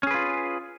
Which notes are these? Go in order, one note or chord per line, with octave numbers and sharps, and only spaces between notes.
C#4 F4 G#4 B4